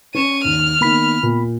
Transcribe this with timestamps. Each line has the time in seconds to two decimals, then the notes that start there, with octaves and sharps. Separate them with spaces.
0.15 C#4 C#6 D#7 E7
0.44 D#2 F6
0.81 D#3 A#3 B3 B5 B6
1.23 A#2